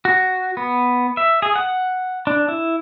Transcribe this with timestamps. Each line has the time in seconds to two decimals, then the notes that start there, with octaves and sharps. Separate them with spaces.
0.05 F#4
0.57 B3
1.17 E5
1.42 G#4
1.56 F#5
2.27 D4
2.48 E4